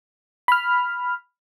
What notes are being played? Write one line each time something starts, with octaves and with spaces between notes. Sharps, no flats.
B5 F6